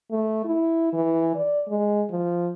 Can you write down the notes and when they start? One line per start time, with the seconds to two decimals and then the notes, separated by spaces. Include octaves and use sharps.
0.11 A3
0.45 E4
0.93 E3
1.35 D5
1.68 G#3
2.10 F3